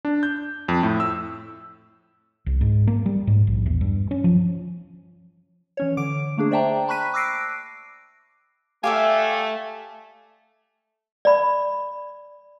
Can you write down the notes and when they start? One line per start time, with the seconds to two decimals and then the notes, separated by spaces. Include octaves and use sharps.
0.05 D4
0.23 G6
0.68 F2
0.83 A2
1.00 E6
2.46 C2
2.61 G#2
2.87 A#3
3.06 G3
3.27 G#2
3.47 A#1
3.66 E2
3.81 G2
4.11 C#4
4.24 F3
5.77 E3 C#4 C#5
5.97 D3 D6 D7
6.37 A3 A#3 D4 G#4
6.51 C5 D5 E5 G5 A5 A#5
6.88 A5 B5 C#6 F#6 B6 D#7
7.14 D6 E6 F#6 A#6 C7 D7
8.84 A3 G4 D5 E5 F5 G#5
11.25 D5 B5